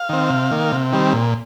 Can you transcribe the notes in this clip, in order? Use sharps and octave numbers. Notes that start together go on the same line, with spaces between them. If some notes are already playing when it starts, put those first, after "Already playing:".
Already playing: F5
D#3 C4
C3
D#3 A#3
C3
D#3 G3 C4
A#2